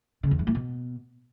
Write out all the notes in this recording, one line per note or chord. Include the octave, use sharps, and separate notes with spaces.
C#3
E2
G2
A2
B2